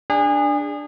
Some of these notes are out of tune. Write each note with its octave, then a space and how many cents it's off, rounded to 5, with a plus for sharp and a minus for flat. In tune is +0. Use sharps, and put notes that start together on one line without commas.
D4 +5 G#4 -30